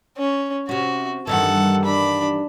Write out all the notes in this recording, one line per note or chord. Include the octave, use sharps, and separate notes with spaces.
C#4
C3 C#4 F#4
G2 D#3 E3 A4 F#5
D4 B5